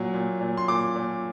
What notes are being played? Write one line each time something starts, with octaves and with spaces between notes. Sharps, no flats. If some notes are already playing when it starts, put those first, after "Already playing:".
Already playing: A#2 F#3
A#2
A#2
C6
A#2 D6
A#2